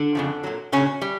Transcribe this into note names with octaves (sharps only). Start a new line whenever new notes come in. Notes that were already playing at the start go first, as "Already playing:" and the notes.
Already playing: D3 D4
F2 C#3 F3
A#2 F#3
A#2 C#3 F#3 C#4
G3